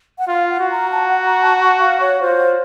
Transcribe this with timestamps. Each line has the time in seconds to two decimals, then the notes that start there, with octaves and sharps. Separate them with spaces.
0.19 F#5
0.28 F4 F5
0.50 F#5
0.60 F#4
0.71 A#5
0.92 A5
1.08 F#5
1.25 A#5
1.41 A5
1.57 F#5
1.79 F5
2.01 C#5
2.21 F4 C5